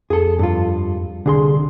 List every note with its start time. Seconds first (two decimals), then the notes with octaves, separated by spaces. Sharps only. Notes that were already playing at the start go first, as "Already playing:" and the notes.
0.10 F2 G#4 A4
0.39 G2 F4
1.26 C2 D3 G#4 C6